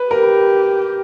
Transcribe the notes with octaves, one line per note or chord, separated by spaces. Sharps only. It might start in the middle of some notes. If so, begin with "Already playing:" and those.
Already playing: B4
G4 A#4